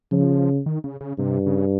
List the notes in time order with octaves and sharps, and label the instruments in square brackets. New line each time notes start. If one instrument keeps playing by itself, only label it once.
[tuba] C#3 [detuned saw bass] F3
[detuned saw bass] D#3
C#3
C#3
[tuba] G2 [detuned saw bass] C3
[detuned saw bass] C#3